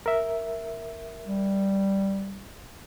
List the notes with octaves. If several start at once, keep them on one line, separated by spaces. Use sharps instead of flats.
A#4 E5
G3